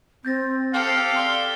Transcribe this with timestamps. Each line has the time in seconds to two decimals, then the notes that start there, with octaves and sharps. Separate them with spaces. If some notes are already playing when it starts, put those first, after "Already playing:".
0.25 C4 G6 A6 A#6
0.74 G4 A4 F5
1.16 D5 C6 D6 G7